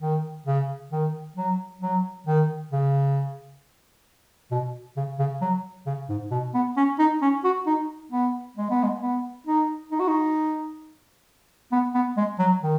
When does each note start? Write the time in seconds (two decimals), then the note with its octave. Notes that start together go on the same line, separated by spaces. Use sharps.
0.01 D#3
0.46 C#3
0.91 D#3
1.36 F#3
1.81 F#3
2.27 D#3
2.71 C#3
4.51 B2
4.96 C#3
5.19 C#3
5.41 F#3
5.86 C#3
6.09 G#2
6.31 B2
6.54 B3
6.77 C#4
6.99 D#4
7.22 C#4
7.44 F#4
7.66 D#4
8.12 B3
8.57 G#3
8.70 B3
8.83 G#3
9.01 B3
9.47 D#4
9.92 D#4
10.00 F#4
10.08 D#4
11.72 B3
11.95 B3
12.17 G#3
12.39 F#3
12.62 D#3